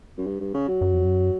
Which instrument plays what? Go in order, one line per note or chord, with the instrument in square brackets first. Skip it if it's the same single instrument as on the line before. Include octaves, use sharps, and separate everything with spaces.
[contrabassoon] F#2
G2
G2
C#3
F#3
[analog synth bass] F#2
F2
F#2